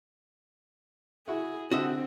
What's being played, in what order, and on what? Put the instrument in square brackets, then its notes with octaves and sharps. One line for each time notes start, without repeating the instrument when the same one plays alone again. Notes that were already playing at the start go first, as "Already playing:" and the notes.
[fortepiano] E4 F#4 [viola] G#4
[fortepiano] D3 [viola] C4 [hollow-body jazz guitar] F#4 D#5 E5